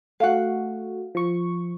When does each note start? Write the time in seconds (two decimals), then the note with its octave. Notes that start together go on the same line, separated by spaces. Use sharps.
0.20 A3 F#4 F5 F#5
1.15 F3 C#6